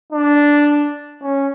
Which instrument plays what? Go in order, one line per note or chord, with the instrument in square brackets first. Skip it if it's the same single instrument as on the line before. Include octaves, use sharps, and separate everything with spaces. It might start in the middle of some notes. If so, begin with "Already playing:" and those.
[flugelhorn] D4
C#4